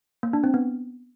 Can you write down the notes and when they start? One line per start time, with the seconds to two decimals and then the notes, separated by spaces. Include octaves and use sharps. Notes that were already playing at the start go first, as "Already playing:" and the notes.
0.23 A#3
0.33 D4
0.44 C4
0.54 B3